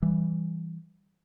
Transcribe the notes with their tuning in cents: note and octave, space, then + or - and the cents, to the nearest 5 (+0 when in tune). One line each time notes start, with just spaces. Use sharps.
E3 +0 G3 +0